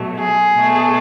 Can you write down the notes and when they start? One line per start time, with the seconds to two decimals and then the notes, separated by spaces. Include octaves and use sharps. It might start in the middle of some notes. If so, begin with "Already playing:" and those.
Already playing: B2 F#3 A3
0.18 G#4
0.56 B2 A3